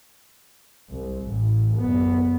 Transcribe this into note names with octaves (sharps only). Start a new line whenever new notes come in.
C2
A1
F#1 B3